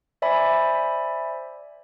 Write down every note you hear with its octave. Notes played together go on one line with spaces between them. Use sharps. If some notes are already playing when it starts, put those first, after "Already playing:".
C5 D5 E5 G#5 B5